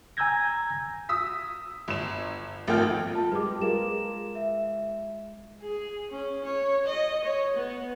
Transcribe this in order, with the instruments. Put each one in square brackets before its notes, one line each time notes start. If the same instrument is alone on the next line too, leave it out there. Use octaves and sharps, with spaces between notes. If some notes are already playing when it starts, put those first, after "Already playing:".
[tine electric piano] G#5 A#5 E6 G6 G#6 A#6
[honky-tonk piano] D#6 E6 B6
G1 E7
G#1 F3 A3 A#3 G5 F6
[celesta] F4 A5
[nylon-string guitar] G#3 G4 [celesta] B4 D6
[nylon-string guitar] G#3 F4 A#4 [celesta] E7
[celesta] E5
[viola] G#4
C#4
C#5
D#5
C#5
B3